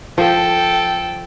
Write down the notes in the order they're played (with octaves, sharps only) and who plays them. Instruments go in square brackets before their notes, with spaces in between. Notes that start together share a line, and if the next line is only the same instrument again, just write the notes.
[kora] F3 [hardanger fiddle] A4 G5